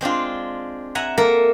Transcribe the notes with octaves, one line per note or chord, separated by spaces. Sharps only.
G#3 C4 D4 F4
E5 F#5 G#5 A#5
A#3 A4 A#4 E5